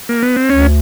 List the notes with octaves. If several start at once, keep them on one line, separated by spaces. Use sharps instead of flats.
A#3
B3
C4
D2 C#4